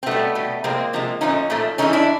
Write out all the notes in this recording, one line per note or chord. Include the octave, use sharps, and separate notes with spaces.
C4
B2 G3 A3 B3
B2 G3
C3 F3 G#3 A#3 C4
C3 F3 G#3
A#2 F3 A3 C#4 D#4
A#2 F3 A3
C#3 E3 G#3 C#4 D#4
D4 E4